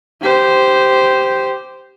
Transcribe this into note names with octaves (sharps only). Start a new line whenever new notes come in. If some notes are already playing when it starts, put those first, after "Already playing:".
G4 C5